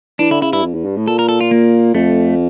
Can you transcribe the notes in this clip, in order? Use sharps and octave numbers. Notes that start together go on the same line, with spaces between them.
E3 D4
D3 E4
C#3 E4
G2 E4
F2
E2
G2
A2
A#2 A4
A#4
A4
F4
A#3
F2 A3